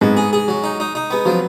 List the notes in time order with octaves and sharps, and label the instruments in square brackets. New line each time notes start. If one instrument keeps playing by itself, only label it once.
[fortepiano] G#2 G#3 [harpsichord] B3
[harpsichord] G#4
G#4
F#3
D#4
D#4
D#4
[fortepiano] G#3 [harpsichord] B3
[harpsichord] F3 [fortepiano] F#3